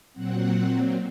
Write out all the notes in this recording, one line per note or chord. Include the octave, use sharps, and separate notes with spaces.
A#2 F#3 C4 F#5